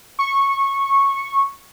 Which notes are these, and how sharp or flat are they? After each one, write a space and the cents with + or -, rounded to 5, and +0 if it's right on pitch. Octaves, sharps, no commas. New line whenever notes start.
C#6 -10